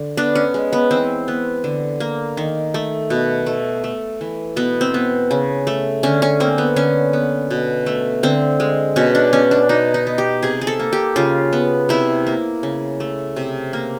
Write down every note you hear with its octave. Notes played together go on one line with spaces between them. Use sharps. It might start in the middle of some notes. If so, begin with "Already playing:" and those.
Already playing: D3
B3 D4
C#4
G#3
B3
E3 C4
B3
D3
A#3
D#3
A3
B2
A3
A3
E3
B2 B3
C4
B3
C#3
A3
D3 C#4
C#4
A#3 C4
B3
D3 C#4
B3
B2
A3
D3 C4
G#3
B2 C#4
D4
B3 C#4
D4
B2 D#4
D#4
B3
G4
C3 G#4
G#4
A4
A#3
G4
C#3 F4
B3
C3 E4
A#3
C#3
A3
C3
A#3